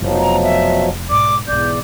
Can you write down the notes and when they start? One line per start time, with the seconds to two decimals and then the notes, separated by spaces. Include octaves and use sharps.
0.01 F1 B2 F3 F#3
0.19 A#5
0.43 E5
1.10 B1 G#2 D5 D6
1.48 B1 E2 G#2 D5 G6